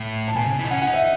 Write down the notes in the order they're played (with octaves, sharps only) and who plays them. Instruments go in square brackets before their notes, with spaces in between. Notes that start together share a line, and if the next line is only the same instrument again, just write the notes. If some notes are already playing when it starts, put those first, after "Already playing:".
Already playing: [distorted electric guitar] A2
[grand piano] A5
[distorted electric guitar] B2 [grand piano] G#5
[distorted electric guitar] C#3
E3
D#4
[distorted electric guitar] C#4 [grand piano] F#5
[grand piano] F#5
[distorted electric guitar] D#4
[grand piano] E5